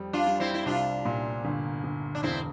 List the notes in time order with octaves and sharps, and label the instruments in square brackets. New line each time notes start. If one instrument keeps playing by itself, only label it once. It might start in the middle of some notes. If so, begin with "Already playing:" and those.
Already playing: [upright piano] F2 G3
[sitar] D4 F4
[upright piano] G3
[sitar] C4 E4
E4
[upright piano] C2 [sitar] D4 F4
[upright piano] A#2
G1
G1
[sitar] D4
[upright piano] E1 [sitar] C4 E4